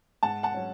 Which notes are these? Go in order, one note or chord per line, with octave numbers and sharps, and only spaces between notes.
G#2 F#5 A5
F#5 A5
F#3 C#4